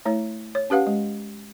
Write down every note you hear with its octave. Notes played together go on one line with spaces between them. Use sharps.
A3 E4 C#5
C#5
C#4 G4 B4 F5 F#5
G#3